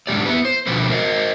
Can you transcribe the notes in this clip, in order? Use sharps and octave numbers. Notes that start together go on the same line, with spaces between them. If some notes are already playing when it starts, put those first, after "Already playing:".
G#2 D3 D#3 G4 D5
B3 E4 B4
C5
B2 D3 F3 B4
A#4 C5 D#5